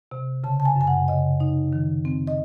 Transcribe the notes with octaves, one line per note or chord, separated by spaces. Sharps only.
C3
C#3 A5
A5
G#5
F#2 G#5
F#5
C#3 D#5
D#4
D#3
C4
D#5